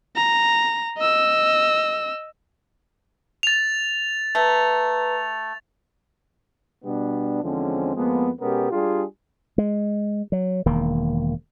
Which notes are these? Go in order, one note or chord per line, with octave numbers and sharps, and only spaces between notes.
A#5
D#5 E6
A6 F7
A3 B4 A#5
B2 G3 B3 D4
E2 D3 F3 G#3 C4 C#4
F2 F3 G#3 A#3 B3
B2 G#3 B3 C#4 G4 A#4
G3 D4 F4 G4 G#4
G#3
F#3
E1 D#3 A#3